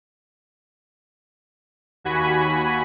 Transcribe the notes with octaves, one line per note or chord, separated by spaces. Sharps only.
D#2 F#4 G#5 B5 B6